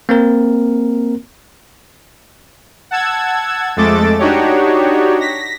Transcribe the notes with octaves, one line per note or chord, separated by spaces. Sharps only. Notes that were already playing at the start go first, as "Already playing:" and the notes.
A#3 C4 A#4
F#5 A5 E6 G#6
F2 G#3 A3 A4 D6 A6
D4 D#4 F#4 G4 C#5
A#6 B6